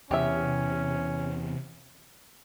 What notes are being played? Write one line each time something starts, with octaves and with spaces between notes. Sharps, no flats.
E2 C3 C#4 G4 E5